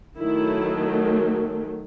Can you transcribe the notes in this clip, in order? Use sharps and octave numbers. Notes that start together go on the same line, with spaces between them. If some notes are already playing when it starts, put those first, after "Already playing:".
D#3 F#3 A3 E4